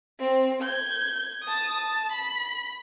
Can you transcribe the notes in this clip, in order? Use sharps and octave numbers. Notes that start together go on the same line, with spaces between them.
C4
G6 G#6
A5 D#6
A5
B5